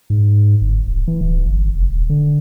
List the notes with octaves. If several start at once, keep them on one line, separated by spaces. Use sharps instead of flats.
G#2
G1
D1
E3
D1
G1
F1
D#1
D3